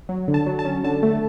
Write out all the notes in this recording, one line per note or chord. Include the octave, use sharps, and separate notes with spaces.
F#3
D3
A5
F#3
A5
C#4
D3 A5
A3